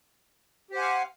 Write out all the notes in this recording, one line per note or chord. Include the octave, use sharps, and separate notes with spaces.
G4 C5 F5 F#5 G#5